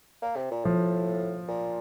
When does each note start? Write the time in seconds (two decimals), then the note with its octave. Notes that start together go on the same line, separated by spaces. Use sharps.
0.22 A#3
0.36 C3
0.51 A#2
0.65 A2 F3
1.48 A#2